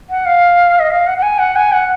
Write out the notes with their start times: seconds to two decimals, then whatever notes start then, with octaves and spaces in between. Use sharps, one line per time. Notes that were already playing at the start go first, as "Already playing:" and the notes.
0.10 F#5
0.26 F5
0.80 D#5
0.91 F5
1.07 F#5
1.18 F#5
1.22 G#5
1.39 F#5
1.56 G#5
1.72 F#5